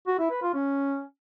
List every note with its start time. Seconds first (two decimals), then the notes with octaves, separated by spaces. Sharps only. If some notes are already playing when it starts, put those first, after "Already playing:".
0.07 F#4
0.19 E4
0.31 B4
0.42 F4
0.54 C#4